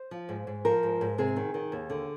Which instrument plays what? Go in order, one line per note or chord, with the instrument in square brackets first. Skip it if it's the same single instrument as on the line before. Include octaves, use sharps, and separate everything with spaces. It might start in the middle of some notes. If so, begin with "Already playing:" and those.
Already playing: [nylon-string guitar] C5
F3
G#2
G#2
F3 A#4
G#2
G#2
C3 G#4
D#3
D#3
D#2
D3